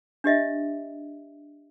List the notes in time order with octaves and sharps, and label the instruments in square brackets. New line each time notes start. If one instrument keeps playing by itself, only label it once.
[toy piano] D4 G4 D#5 E5